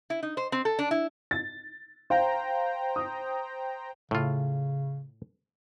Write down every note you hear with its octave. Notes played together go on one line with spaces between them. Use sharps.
E4
D#4
C5
C4
A4
D4
E4
A6
C5 F5 G5 A#5
D#6
A2 C#3 F4